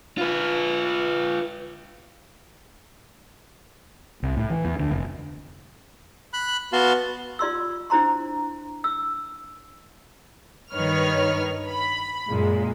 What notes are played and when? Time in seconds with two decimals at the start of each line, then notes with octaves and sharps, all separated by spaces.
0.18 F4 B4
4.23 C2
4.37 A2
4.50 E3
4.65 E2
4.79 D2
4.91 F1
6.33 B5 F#6
6.73 B3 F#4 F5 A5 C6
7.39 F4 D5 C6 E6
7.90 D4 E4 C5 A#5 C6
8.84 E6
10.72 G2 D#3 B4 C#5 F6
11.68 B5
12.30 F#2 A#2 G#3